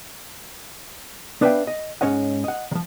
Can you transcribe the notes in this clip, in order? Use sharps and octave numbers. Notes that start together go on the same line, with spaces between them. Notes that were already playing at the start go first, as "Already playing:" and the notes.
B3 D4 B4 E5 F5 G5
D#5
G#2 F3 C#4 C#5 D#5 F#5
D#5 F#5
D#3 F3